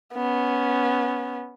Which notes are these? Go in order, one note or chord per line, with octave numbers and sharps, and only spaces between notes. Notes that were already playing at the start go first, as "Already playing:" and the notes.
B3 C#4